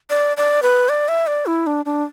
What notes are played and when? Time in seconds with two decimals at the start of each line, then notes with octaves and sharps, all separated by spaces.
0.10 D5
0.37 D5
0.63 B4
0.89 D5
1.08 E5
1.27 D5
1.46 E4
1.67 D4
1.86 D4